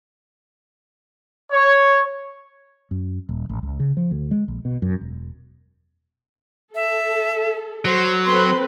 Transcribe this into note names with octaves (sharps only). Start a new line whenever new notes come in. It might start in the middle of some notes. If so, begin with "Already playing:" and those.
C#5
F#2
D#1
A1
C#2
C#3
F3
D2
G#3
A#1
B2
F#2
E1
A4 E5
F#3 C5
C4 A4 B4 C6